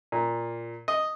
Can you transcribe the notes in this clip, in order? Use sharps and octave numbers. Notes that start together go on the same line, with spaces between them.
A#2
D#5